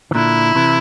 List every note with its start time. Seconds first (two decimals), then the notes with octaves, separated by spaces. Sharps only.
0.11 E3
0.15 A#2 D3 E4
0.55 C3 E3